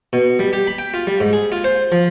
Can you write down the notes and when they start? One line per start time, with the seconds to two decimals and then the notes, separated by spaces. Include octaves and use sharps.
0.13 B2
0.39 G3
0.53 G4
0.67 B5
0.79 G5
0.94 F4
1.07 G3
1.20 G#2
1.33 G#4
1.52 F4
1.64 C5
1.92 F3